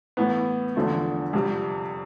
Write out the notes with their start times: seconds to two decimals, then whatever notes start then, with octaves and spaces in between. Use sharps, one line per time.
0.17 A2 E3 B3
0.76 E2 D3 F3 A3
1.33 F2 C3 G3